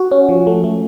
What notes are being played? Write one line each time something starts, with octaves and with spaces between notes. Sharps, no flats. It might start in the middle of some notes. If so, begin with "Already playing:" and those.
Already playing: F#4
C#4
F3
A3
A3